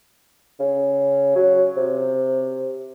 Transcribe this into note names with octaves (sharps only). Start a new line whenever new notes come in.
C#3
F#3
C3